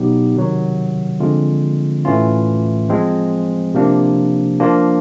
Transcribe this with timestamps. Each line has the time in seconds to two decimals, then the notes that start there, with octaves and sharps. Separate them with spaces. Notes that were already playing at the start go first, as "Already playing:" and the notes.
Already playing: B2 F#3 B3 D#4 G4
0.35 C3 D#3 F#3
1.20 D3 F3 G#3 C4 F4
2.05 A2 E3 A3 C#4 F4
2.90 F3 G#3 C4
3.74 C3 F3 A#3 D4
4.60 F3 A#3 D4 F4